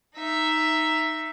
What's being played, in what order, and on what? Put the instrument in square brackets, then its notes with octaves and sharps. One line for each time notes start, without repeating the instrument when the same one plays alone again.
[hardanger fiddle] D#4 E5